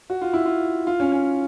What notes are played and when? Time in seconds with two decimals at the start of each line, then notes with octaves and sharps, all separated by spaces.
0.10 F#4
0.21 F4
0.33 E4
0.46 F4
0.87 F4
1.00 C#4
1.12 C#4